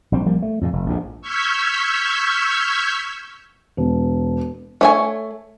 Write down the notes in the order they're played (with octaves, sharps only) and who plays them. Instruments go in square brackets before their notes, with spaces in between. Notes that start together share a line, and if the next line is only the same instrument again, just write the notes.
[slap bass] A#1 G3 C4
F3 G3 A#3
A3
F2 A#2 C#3
F1
A#1 D#2 G#2
[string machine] C#6 E6 F6 G6 G#6 B6
[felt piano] E1
[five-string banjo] A3 C#5 G#5